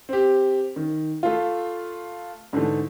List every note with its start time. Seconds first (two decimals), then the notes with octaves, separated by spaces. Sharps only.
0.09 C4 G4
0.76 D#3
1.23 A3 F4
2.53 G#2 D3 E3 A3